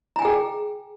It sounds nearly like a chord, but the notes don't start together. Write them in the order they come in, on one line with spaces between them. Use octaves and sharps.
A#5 G#5 G5 G#4